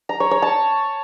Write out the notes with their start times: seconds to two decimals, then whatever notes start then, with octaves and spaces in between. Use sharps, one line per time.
0.09 A#5
0.20 C#5
0.31 C#5
0.42 A5